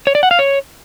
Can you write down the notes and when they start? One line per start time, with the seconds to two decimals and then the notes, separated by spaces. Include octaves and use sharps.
0.07 C#5
0.15 D5
0.23 F#5
0.31 F5
0.39 C#5